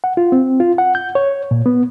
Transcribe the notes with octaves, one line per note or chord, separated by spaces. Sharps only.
F#5
F4
C4
F4
F#5
G6
C#5
A#2
B3